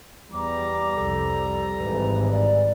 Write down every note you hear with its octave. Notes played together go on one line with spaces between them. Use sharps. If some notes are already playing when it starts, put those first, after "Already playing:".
E2 G3 A#5 D6
C2 F2 A4
G#1 E3 B4
D5